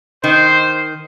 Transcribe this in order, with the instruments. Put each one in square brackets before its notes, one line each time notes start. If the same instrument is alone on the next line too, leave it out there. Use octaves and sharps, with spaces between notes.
[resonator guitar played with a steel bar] D#3 [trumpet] C5